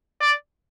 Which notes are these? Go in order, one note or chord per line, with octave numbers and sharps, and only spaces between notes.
D5